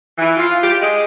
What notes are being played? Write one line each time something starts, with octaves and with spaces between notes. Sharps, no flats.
E3
F4
G4
G#3